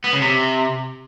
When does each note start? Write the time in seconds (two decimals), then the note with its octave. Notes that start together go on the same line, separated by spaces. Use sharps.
0.04 B3
0.13 C#3
0.22 C3